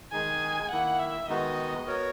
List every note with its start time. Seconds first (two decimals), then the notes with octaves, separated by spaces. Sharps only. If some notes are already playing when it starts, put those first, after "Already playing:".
0.12 D#3 G#3 D#4 G#4 G#5
0.71 D#3 A#3 E4 F#5
0.99 E5
1.28 D#3 G#3 B3 D#4 F#4 D#5
1.86 B3 F#4 A#4 C#5